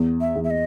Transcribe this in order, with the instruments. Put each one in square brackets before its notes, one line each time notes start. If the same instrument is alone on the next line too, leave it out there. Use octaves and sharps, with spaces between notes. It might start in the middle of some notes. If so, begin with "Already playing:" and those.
Already playing: [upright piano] E2
[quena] E5
[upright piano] E2
[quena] E5
D#5